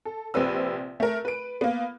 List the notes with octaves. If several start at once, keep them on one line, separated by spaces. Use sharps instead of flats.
A4
A#1 C3 C4 B4 E6
A3 A#4
B4 D7
A#3 B3